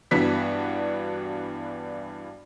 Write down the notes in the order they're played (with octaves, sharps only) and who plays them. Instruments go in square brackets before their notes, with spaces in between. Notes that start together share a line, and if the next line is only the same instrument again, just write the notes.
[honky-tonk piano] G2 E3 B3 D4 F#4 B6